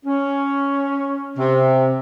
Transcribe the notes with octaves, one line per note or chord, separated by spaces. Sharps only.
C#4
C3